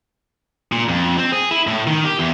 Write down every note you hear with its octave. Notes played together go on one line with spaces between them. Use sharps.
A#2
F2
C4
G#4
E4
A2
D#3
G4
E2